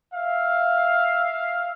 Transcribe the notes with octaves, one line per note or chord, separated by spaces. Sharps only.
E5 F5